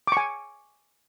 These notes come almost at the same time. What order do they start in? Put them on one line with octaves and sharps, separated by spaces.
D6 C#6 G#5